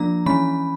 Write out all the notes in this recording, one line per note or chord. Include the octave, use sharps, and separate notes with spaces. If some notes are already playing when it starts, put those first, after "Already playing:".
Already playing: F3 A#3 D4 A#5
E3 G#3 C#4 B5